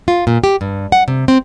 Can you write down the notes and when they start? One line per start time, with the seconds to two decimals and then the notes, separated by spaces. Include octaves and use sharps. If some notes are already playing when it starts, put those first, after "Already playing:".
0.08 F4
0.27 A#2
0.44 G4
0.61 G2
0.92 F#5
1.08 C3
1.28 C4